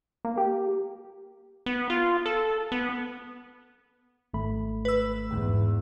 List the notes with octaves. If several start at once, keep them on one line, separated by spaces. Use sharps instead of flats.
A#3
G4
B3
F4
A4
B3
G#1 A3 B5
B4 E6
E2 G#2